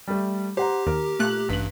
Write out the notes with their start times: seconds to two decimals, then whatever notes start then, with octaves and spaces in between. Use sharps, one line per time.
0.07 G3 A3
0.57 G4 C5 F#5 A#5
0.87 D#2 A#4
1.19 A#2 A3 F#6
1.49 A1 G2 B6 F#7